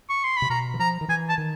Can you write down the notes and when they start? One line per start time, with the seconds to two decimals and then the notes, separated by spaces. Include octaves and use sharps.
0.09 C#6
0.24 C6
0.37 B5
0.42 C3
0.50 B2 A#5
0.74 E3
0.79 F3 A#5
1.01 D#3
1.08 E3 G#5
1.29 A5
1.38 D#3